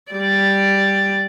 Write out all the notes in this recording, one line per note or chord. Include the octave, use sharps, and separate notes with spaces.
G3 D5